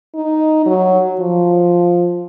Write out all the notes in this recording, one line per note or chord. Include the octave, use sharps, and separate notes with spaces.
D#4
F#3
F3